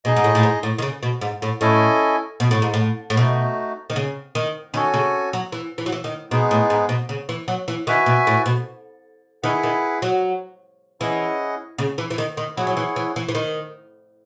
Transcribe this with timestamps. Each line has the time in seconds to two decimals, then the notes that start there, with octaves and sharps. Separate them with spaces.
0.05 B2 D#4 G#4 D#5
0.16 G#2
0.24 A2
0.35 A2
0.43 G#2
0.63 A2
0.78 D#3
0.82 C#3
1.03 B2
1.21 G#2
1.42 A2
1.61 A2 C#4 E4 A4 D#5 G#5
2.40 B2
2.51 A2
2.62 G#2
2.74 A2
3.10 A2
3.17 B2 A3 D#4 F#4
3.90 D#3
3.96 C#3
4.35 D#3
4.74 D#3 C#4 F#4 A4 C#5 G#5
4.94 C#3
5.33 F#3
5.52 E3
5.78 E3
5.86 F#3
5.92 E3
6.04 D#3
6.31 B2 G#3 B3 D#4 G#4
6.51 A2
6.70 G#2
6.89 B2
7.09 C#3
7.29 E3
7.48 F#3
7.68 E3
7.87 D#3 F#4 B4 E5 G#5
8.06 B2
8.27 A2
8.46 B2
9.43 D#3 E4 G#4 B4 F#5
9.63 D#3
10.02 F#3
11.01 E3 C#4 E4 G#4 D#5 F#5
11.78 C#3
11.98 E3
12.10 E3
12.18 D#3
12.37 D#3
12.56 F#3 E4 G#4 C#5 F#5
12.67 F#3
12.77 E3
12.96 E3
13.16 E3
13.29 E3
13.35 D#3